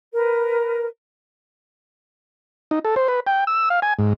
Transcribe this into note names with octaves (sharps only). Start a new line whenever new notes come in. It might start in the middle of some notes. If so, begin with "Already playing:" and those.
A#4 B4
D#4
A4
C5
B4
G5
E6
F5
G#5
G#2